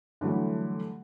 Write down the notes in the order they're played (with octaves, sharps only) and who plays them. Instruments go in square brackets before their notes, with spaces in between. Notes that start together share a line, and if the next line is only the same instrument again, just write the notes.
[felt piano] D3 E3 F#3 G3 A3